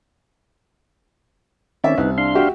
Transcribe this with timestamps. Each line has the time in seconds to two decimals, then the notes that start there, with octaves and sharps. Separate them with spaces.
1.84 D#3 C4 C#4 D5 E5
1.98 C2 D#4 B4
2.18 D4 F5 C6
2.35 F#4 G4 E5